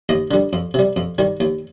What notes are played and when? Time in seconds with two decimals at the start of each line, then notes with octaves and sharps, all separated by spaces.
0.09 D#2 D#5
0.31 D3 G3
0.53 F2
0.74 C3 G3
0.96 F2
1.18 D#3 G3
1.40 D#2